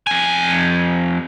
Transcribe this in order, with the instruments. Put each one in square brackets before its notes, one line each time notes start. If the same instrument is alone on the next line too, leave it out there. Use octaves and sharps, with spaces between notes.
[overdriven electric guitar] F2 G#5